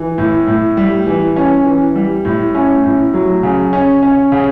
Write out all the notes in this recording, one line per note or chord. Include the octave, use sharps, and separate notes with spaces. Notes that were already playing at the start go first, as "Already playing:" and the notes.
Already playing: E3
A2
A2
G3
E3
C#4
E3
G3
A2
C#4
A2
F#3
C#3
C#4
C#4
C#3